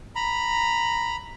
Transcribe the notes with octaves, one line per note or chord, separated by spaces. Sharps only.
A#5 B5